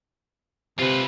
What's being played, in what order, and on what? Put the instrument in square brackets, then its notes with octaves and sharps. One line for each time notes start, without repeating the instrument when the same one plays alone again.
[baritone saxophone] C3 [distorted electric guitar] F4 B4